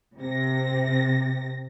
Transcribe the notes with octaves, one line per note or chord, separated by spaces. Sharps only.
C3 A#6